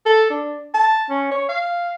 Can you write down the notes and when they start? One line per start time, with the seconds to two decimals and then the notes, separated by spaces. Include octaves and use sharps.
0.06 A4
0.30 D4
0.74 A5
1.10 C#4
1.31 C#5
1.49 F5